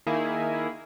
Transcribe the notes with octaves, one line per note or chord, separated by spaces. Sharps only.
D#3 A#3 E4 G#4